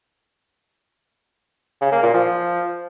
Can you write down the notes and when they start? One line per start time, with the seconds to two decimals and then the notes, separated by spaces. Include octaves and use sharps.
1.81 C#3
1.92 A#3
2.03 A#2
2.14 F3